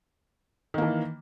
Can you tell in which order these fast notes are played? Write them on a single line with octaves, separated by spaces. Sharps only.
D#3 A#3 E3